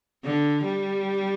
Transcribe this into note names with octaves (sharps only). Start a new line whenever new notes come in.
D3
G3